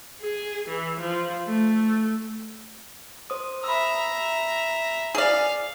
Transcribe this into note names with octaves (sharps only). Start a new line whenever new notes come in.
G#4
E3
F3
A3
C5 D#6
E5 A#5 B5 E6
G#4 D5 F5